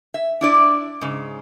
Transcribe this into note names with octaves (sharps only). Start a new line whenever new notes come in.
E5
D4 E4 D5
G#2 C#3